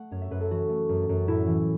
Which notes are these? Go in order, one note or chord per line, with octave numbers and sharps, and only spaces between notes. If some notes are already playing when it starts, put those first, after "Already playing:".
Already playing: A3 F#5
F#2 C#5
E5
F#2 B4
A4
E3 F#4
A3
F#2
F#2
A2 E4
E3